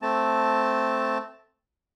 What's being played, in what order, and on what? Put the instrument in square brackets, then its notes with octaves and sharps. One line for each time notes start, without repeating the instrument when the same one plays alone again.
[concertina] A3 C4 A5